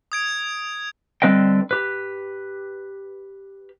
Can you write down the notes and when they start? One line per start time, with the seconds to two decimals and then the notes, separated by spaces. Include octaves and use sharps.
0.12 D#6 G#6 D7
1.22 D3 G3 C4 B4 D#5 G5
1.71 G4 B4